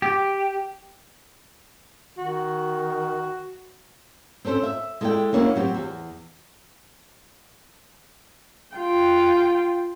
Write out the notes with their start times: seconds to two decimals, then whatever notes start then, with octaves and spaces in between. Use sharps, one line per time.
0.02 G4
2.18 D#3 F#4
4.45 C4 C#4 A4 C5
4.63 E5
5.01 G#3 E4 A4 B4 D5 G5
5.33 A#3 C#4 D4 E4 F#4
5.56 F#3 C4 G4
5.74 E2
8.76 F4 G5